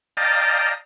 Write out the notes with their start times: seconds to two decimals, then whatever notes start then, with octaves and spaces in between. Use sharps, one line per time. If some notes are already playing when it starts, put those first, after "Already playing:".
0.17 D5 D#5 F5 G5 A5 A#5